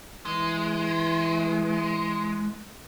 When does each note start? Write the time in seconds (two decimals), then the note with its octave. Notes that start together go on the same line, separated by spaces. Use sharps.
0.25 E3 G#3